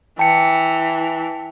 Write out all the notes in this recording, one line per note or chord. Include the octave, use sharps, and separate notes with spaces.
E3 G5 A5 C#7